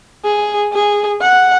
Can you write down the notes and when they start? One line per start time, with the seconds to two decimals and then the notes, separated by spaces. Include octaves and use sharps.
0.25 G#4
0.73 G#4
1.21 F#5